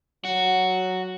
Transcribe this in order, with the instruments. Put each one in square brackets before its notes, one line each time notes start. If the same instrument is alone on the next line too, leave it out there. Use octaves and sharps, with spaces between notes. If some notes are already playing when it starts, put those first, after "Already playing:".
[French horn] F#3 [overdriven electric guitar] F#4